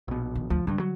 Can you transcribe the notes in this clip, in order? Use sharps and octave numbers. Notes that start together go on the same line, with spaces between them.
A#1 B2
D#3
D2 F3
G2 D3 G3
F#3